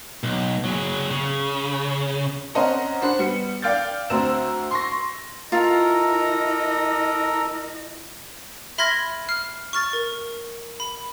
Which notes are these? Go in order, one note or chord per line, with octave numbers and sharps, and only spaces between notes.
B1
F#3 G#4
C#3
C4 C#4 C5 D#5 F#5 A#5
D4 C5 F#5 B5
G3 B3 C#7
D5 F5 G5 F6 G6 A6
D2 C4 C5 A#5 E6 E7
C6 C#6 A#6
E4 F4 A4 A#4 D#5 A#5
E5 B5 C6 F6 G#6 A#6
F6 C7
C#6 F6 A6
A#4
B5